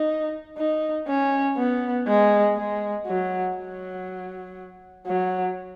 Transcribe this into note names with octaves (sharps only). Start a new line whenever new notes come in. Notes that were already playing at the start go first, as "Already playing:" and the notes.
Already playing: D#4
D#4
C#4
B3
G#3
G#3
F#3
F#3
F#3